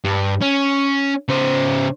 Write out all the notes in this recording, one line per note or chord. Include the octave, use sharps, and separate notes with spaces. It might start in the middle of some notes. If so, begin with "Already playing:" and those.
G2
C#4
C#3 C5